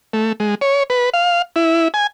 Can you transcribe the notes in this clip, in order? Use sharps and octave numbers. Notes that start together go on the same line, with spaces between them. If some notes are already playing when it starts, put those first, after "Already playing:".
A3
G#3
C#5
B4
F5
E4
G#5